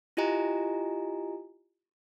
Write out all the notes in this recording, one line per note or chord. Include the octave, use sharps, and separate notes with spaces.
E4 F4 G4 D#5 G#5 A#5